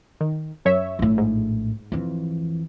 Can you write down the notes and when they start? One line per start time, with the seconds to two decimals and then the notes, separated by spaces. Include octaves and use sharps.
0.21 D#3
0.65 F#2 C#5 E5
0.99 A#1 A2
1.18 G#2
1.92 F2 E3